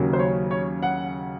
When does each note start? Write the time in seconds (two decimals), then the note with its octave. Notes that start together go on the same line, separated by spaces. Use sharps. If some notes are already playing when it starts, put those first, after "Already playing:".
Already playing: D#2 C#3 F#3
0.13 C5
0.19 C#5
0.51 C#5
0.83 F#5